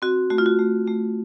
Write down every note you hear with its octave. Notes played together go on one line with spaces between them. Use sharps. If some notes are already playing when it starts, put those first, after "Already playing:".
C4 F#4
A3 F#4
F4
F#4
A3
A3